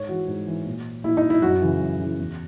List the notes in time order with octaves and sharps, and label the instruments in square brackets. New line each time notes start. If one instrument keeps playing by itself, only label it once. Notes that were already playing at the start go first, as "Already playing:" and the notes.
Already playing: [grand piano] G#2 C#5
E3 F#4
G#2
E3
A#2
A#2 E4
D#4
E4
F#2 F#4
C#3 E3
F#2
C#3 E3
E2